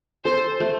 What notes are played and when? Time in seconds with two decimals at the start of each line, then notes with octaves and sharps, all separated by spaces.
0.24 A4 C5
0.60 A3